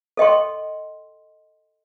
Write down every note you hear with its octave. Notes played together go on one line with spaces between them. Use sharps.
A4 D#5 G5 C6